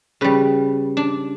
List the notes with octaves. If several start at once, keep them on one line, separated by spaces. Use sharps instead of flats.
C#3 G3 B4
D4